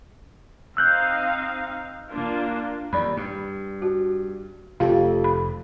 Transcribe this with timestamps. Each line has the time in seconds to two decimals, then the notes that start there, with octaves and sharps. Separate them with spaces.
0.77 C4 D#4 F5 E6 F#6 G6
2.11 A#3 D4 F4
2.93 D#2 D5 B5
3.17 G2
3.82 F#4
4.80 F1 F2 F4 G4 A4 F5
5.24 B5